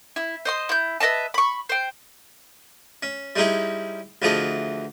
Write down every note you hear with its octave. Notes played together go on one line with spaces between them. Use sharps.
E4
C5 D#5 C6
E4 G6
B4 D#5 E5 A5
B5 C#6
C5 G5
C#4
G3 G#3 C#4 D#4 E4 G#4
D2 E3 F3 G#4 A4 D#5